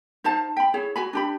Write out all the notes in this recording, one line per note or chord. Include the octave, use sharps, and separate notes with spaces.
D#4 C5 F5 A5
G5 B5
E4 G#4 C#5
F#4 G#5 B5
D4 G4 B5